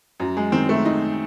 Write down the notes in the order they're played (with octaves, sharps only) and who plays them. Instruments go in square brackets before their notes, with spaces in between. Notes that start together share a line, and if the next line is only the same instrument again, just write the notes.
[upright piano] F#2 [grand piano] F#3
[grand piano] G#3
[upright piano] D#3 [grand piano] C4
[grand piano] A3
[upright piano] D#4